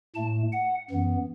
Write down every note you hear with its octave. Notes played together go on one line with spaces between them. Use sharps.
A2 A3 A5
F#5
F#2 E3 B3